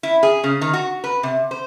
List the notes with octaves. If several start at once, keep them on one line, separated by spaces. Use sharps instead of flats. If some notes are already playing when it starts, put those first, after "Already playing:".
E4
G#4
C#3
D#3
F#4
B4
C3
C5